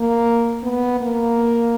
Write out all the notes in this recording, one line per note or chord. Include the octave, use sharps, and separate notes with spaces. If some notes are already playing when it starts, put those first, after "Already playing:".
Already playing: A#3
B3
A#3